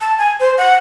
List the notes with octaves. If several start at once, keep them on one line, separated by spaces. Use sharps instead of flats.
A5
G#5
C5
F#5